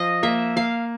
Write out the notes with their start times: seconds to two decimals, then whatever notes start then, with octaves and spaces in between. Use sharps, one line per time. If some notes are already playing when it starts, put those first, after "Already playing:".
Already playing: F3 D#5 F5
0.23 A#3 E5
0.56 A#3 F5